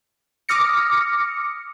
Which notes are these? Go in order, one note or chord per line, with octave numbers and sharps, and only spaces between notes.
D6 D#6 F6 A#6 C#7